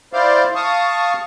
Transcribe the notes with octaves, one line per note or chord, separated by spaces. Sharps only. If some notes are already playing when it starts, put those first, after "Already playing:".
E4 C5 D5 F5
F5 A5 C#6 D#6